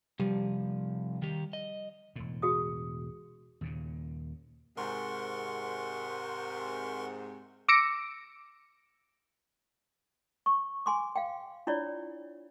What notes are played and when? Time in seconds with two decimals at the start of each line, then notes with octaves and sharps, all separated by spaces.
0.20 C3 F3 G3
1.22 D#3 G4
1.53 D#5
2.16 E1 A2
2.42 F#4 G#4 D#6
3.61 D#2 A#2 C#3
4.77 G#2 C3 A#4 F#5 C6 C#6
7.69 D6 E6 A#6 C#7 D7
10.46 C#6
10.86 G#5 C6 D6
11.16 F5 G5
11.67 D4 E4 F4 C#5 D5